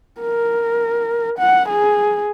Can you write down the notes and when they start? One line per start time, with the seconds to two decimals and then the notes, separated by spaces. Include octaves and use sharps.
0.21 A#4
1.39 F#5
1.69 G#4